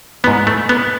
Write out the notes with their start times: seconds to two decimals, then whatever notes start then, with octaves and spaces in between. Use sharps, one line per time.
0.24 E3 B3
0.27 G#2
0.47 A3
0.69 B3